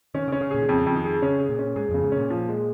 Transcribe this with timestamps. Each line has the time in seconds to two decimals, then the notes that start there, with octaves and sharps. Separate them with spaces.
0.14 D#3 C#4
0.28 C#3
0.32 C#4
0.41 C#3
0.51 A#2 G#4
0.61 D#3
0.69 F2 C#3
0.86 F2
0.96 D#3
1.04 G#4
1.22 C#3 C#4
1.40 G#4
1.49 A#2
1.59 C#4
1.76 G#2 G#4
1.89 F2 C#3
2.03 G#2
2.12 A#2 C#4
2.30 F3
2.48 G#3